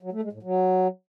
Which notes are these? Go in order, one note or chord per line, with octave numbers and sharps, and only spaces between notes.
F#3
A3
G#3
A2
F#3